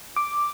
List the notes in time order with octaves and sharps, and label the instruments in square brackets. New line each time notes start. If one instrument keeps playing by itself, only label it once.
[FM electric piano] D6